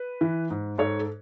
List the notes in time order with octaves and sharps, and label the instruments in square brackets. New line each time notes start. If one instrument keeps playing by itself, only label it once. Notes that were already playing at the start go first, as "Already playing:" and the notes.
Already playing: [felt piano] B4
E3
G#2
G#2 A4 C#5
A4